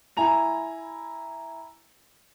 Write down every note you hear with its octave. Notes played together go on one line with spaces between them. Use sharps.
E4 G#5 A#5 F7